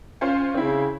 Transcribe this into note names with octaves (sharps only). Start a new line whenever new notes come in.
C#4 F4 C5
C#3 C4 E4